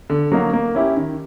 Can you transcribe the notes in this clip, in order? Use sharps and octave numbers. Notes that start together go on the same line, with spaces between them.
D3
F#3 A#3 D#4 F#4
A#3
C#4 E4 G4
D#3